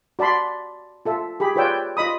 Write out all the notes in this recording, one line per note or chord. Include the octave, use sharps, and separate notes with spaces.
F#4 D5 A5 B5 C6
F4 A4 E5
G4 G#4 B5
F4 B4 C#5 D5 G5 E6
F4 D#5 B5 D#6